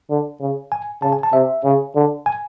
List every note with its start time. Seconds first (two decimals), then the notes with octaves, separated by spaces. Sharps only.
0.10 D3
0.41 C#3
0.72 G#5
1.02 C#3 A5
1.12 G#5
1.23 A5
1.33 C3 E5
1.64 C#3
1.95 D3
2.26 G#5